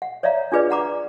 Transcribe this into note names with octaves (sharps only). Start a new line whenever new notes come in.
F#5
C#5 D5 E5 F5 A#5
D4 F4 G#4 B4 D5
F#5 A#5 D6